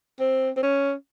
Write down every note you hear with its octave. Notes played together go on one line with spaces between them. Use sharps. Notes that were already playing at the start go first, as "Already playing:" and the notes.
C4
C4
C#4